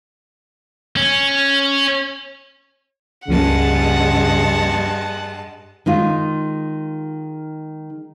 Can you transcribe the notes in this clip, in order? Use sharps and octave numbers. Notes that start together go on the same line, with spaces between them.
C#4
C#2 G2 C#3 F3 G#3 A#3 F#5 A5
D#3 G#3 D#4 F4